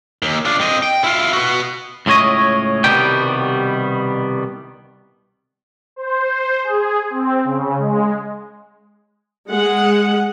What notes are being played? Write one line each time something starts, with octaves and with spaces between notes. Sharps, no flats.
D#2
D4 F4
C4 D#5
G5
E4 F4
B3 F#4
C#2 A2 C#4 C#5 D#5
C2 B2 D#3 G3 B3 G5
C5
G#4
C4
C#3
G#3
G#3 F#5